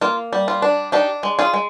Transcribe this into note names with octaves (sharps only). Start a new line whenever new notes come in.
A#3 F4
G3
F4
D4
D4 D#4 G4
G#3
F4 G#4
G#3